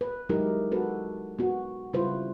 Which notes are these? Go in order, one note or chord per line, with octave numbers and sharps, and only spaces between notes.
B4
F#3 G#3 D#4 E4 G4 A#4
B3 F#4 A4 B4
B3 F#4
C#3 G3 E4 F4 B4 C5